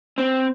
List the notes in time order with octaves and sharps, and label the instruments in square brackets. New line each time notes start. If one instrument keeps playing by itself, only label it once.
[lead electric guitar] C4